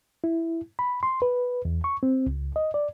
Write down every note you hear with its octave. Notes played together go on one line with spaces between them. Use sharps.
E4
B5
C6
B4
E2
C#6
C4
C#2
D#5
D5